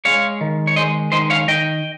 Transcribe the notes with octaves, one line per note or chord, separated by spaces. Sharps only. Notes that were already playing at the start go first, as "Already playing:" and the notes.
G#3 C#5 F5
D#3
C#5
G#3 C5 D#5
D#3 C5 D#5
C#5 F5
D#3 D#5 G5